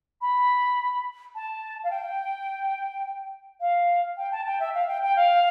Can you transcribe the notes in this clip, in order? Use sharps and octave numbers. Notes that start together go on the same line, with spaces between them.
B5
A5
F5
G5
F5
G5
A5
G5
E5
F5
G5
G5
F5